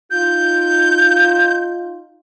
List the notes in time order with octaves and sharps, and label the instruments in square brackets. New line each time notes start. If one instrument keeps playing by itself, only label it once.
[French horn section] D#4 F4 [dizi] G6